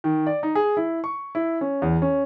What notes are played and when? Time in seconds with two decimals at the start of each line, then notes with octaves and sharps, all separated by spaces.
0.04 D#3
0.27 D5
0.43 D#4
0.55 G#4
0.77 E4
1.04 C#6
1.35 E4
1.61 C#4
1.82 E2
2.02 C#4